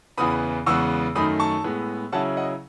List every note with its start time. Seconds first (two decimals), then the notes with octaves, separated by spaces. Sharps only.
0.18 E2 C#3 E3 B3 B5 D#6
0.66 E2 C#3 G#3 B3 C#6 E6
1.15 F#2 D#3 A3 D#4 B5 D#6
1.40 A5 C#6
1.64 A2 G#3 B3
2.12 C#3 F#3 C#4 E4 F#5 A5
2.37 D#5 F#5